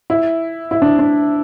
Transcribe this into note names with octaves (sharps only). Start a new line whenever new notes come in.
E4
E4
D4
D4